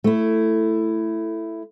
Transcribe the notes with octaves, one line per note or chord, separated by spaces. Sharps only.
A3 E4